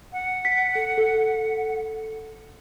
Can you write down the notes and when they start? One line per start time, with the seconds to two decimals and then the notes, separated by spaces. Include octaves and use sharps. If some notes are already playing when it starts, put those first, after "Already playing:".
0.13 F#5
0.45 B6
0.75 A4
0.98 A4